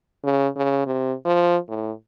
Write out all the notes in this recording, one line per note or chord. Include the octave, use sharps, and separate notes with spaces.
C#3
C#3
C3
F3
A2